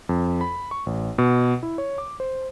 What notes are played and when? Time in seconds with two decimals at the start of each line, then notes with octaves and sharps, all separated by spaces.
0.09 F2
0.41 B5
0.71 C#6
0.86 A1
1.18 B2
1.63 E4
1.78 C#5
1.98 D6
2.20 C5